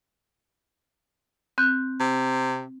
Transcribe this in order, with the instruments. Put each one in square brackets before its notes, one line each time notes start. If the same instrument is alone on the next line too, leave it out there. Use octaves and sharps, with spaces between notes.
[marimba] C4 F#6 G6
[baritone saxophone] C3